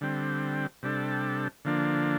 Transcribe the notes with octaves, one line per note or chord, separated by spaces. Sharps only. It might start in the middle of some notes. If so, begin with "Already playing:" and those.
D3 G3 C4
C3 G3 D4 A4
D3 F3 A#3 D4